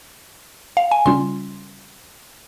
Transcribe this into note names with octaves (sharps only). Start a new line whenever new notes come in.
F5
G#5
C#3 G3 C#4 F4 C6